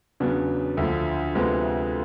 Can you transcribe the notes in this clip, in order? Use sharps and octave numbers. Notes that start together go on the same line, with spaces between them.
E2 C#3 F#3 B3 D4
D2 D3 F3
D2 C3 F3 G#3 B3